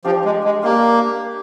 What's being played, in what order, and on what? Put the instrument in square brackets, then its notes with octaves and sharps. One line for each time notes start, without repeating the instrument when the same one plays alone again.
[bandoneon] F3 [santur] D4 G4 D5 F5
[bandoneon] G#3
G#3
[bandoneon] A#3 [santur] D4 G4 D5 F5